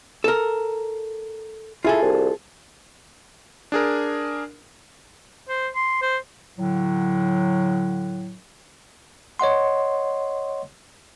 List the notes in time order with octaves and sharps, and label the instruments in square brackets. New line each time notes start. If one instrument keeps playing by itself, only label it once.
[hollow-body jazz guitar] A4 A#4
[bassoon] E4 [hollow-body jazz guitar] F4 G#4 A4
[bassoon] C2
[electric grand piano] D4 G#4 A#4
[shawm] C5
C6
C5
[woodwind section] A2 D3 F#3
[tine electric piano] C#5 D#5 F#5 C6